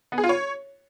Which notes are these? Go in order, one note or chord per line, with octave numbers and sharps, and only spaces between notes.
B3
G#4
F4
C#5